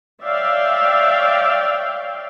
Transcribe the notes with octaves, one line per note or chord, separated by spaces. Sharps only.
C#5 D5 E5 F5 G5